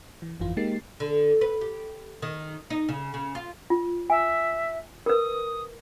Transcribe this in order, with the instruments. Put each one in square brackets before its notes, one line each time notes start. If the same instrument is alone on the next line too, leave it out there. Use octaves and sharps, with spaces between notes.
[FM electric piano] E3
G1 F2 E3 F4
G#3 A#3 D#4 G4 A6 C7
[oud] D3
B4
G4
D#3
D#4
C#3
C#3
F4
[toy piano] F4
[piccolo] E5 [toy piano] G#5
[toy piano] A#4 B4 [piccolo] D#6